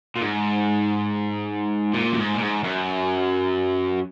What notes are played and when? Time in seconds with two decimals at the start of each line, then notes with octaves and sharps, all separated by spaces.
0.16 A#2
0.21 G#2
1.94 A#2
2.12 F#2
2.18 G#2
2.34 A#2
2.40 G#2
2.63 F#2